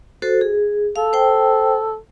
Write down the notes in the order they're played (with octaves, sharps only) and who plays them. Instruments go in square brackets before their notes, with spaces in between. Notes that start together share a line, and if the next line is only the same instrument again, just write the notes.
[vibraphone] F#4 A4 C5
G#4
[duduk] A4 [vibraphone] F5
[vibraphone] C5 G5